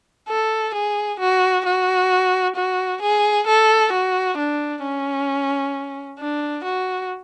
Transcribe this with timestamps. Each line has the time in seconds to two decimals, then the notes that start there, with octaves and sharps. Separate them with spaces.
0.29 A4
0.74 G#4
1.20 F#4
1.66 F#4
2.56 F#4
3.02 G#4
3.47 A4
3.93 F#4
4.38 D4
4.83 C#4
6.19 D4
6.64 F#4